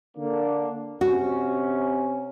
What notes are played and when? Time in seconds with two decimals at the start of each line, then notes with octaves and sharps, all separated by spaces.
0.17 D3 A#3 D4
1.01 C3 C#4 F#4